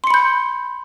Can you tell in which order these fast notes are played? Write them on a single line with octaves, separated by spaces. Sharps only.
C6 C#7 B5 G6